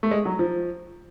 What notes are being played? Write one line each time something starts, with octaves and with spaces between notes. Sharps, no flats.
A3
G#3
F#3
F3